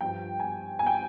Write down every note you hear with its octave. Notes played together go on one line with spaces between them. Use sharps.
G2 F3 G5
G#5
G#5
G5